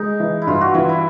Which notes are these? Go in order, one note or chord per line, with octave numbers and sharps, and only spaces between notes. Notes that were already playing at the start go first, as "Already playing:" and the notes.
Already playing: G#3 D#4
E3
E4
G2 F4
F#4
E3 F4
E4